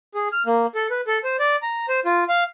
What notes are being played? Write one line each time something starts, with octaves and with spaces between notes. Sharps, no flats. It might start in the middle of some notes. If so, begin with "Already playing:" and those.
G#4
F6
A#3
A4
B4
A4
C5
D5
A#5
C5
F4
F5